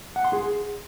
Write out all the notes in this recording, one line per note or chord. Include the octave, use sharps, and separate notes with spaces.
F#5
C6
G#4